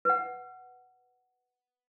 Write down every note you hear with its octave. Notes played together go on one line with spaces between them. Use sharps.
B4 F#5